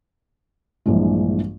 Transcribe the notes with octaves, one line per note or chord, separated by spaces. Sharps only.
A#1 G2 E3 G#3